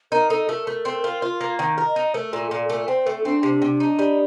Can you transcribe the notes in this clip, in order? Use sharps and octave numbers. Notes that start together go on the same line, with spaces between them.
D#4 A#4
D#4 A4
A3 A#4
A3
C4
F4
F4
A#3
D#3
A#4
D#5
D#4
A3 A#4
A#2 A4
A#2 A4
A3 A#4
C4 C5
A3 A4
C4 D4
C3
C3
D#4
G3